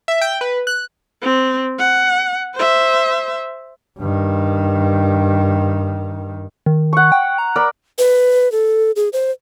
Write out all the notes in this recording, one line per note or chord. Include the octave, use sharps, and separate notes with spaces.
E5
G5
B4
F#6
C4
F#5
C5 E5
G2 D#3
D#3
F#5 C#6
G5
A#5
A#4 D5 B5
B4
A4
G#4
C5